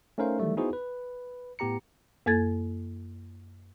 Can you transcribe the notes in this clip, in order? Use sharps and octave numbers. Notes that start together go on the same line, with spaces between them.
A3 C#4 D#4 A#4 C5 F5
D#3 E3 F#3 G3 A3
B3 D#4 E4 F#4 G#4 C5
B4
A2 B3 G4 A#5 C#7
F#2 A#3 A4 G#6 A6